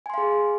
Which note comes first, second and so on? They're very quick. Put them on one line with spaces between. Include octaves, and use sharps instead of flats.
G#5 C6 F5 G#4